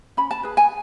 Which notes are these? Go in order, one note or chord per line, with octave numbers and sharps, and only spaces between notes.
C#4 B5
A5
G#4 B4
G#5